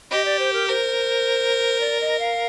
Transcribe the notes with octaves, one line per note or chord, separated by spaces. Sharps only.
G4 D#5
D5
C5
A#4
A#4 C5
D5
D#5
F5